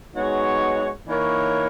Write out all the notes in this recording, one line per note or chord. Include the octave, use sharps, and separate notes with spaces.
G#3 B3 D#4 F#4 C#5
E3 A#3 D#4 A#4 C#5